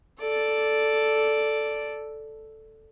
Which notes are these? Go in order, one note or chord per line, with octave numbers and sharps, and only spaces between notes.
A4 D5